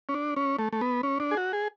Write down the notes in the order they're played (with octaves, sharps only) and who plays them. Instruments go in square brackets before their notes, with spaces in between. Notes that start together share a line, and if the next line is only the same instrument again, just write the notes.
[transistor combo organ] C#4
D4
C#4
A3
A3
B3
C#4
D4
G#4
F#4
G#4